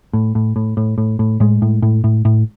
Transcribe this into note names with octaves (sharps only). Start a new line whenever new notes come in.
A2
A2
A2
A2
A2
A2
A2 G#3
A2
A2
A2
A2